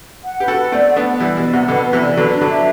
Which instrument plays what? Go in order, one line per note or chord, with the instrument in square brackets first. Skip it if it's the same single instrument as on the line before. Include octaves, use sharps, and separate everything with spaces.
[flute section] F#5
[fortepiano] G4 [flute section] B4
[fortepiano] F#4 A4
[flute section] B4
[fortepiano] A3 C4 [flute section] D5
[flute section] F#5
[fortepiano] B3 D4
[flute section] B4
[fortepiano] E3 G3 [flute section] B4
[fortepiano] B2 [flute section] D5
[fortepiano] C3 [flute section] F#5
[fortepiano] B2 D3 [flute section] B4
[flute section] B4
[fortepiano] C3 E3
[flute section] D5
[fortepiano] D3 F#3 [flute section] B4
[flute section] D4
[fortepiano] D3 F#3
[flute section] E5